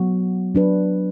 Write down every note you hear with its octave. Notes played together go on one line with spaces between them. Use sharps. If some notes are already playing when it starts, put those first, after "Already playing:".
Already playing: F#3 B3 F#4
F#3 D4 B4